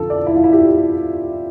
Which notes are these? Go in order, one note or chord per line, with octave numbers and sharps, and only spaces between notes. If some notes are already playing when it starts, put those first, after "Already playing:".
Already playing: F2 D3 F3 F4 A4
D5
E4
F4
E4
G4